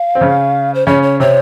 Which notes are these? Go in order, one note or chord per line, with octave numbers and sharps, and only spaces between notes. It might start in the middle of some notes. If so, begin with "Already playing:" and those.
Already playing: F5
C4
C#3 C#4
C5
C#3 C#4 C#5
C#5
C3 C4 C#5